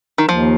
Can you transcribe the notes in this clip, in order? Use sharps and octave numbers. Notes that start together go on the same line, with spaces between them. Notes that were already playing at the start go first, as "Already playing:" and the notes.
D#3
D#2 F3